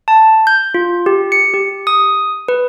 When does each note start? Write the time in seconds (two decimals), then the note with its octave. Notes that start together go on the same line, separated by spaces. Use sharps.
0.08 A5
0.47 G6
0.74 F4
1.06 G4
1.32 C#7
1.54 G4
1.87 D#6
2.48 B4